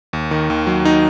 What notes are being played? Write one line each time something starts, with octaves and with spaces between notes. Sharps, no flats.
D#2
D#3
D#2
F#3
D#4